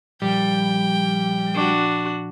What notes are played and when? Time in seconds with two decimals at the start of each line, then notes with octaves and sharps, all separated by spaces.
0.22 A#2 F3 G3 G4 G5
1.55 D4 F#4